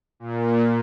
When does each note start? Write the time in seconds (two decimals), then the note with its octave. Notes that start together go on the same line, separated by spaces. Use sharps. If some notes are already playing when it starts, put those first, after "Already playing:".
0.20 A#2